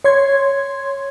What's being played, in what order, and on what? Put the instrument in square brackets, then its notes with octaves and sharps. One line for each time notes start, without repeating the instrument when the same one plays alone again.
[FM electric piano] C#5 C6 G#6